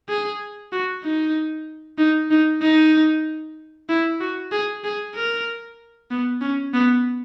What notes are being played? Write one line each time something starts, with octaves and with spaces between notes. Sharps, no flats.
G#4
F#4
D#4
D#4
D#4
D#4
E4
F#4
G#4
G#4
A#4
B3
C#4
B3